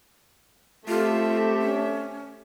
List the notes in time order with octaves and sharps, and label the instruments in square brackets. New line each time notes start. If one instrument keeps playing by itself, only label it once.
[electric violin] A3 E5 [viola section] C4 G4 A4 [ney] F4
[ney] C#4